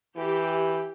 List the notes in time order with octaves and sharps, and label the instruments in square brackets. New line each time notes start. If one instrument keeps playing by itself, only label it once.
[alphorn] E3 [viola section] G4